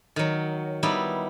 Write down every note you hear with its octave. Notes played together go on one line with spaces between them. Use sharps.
D#3 F#3
G3 B3 D#4 E4